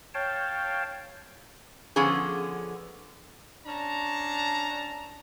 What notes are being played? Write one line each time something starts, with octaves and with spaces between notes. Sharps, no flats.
C#5 F5 G5 A5
D3 F3 B3 C#4 G#4
C#4 D4 A5 A#5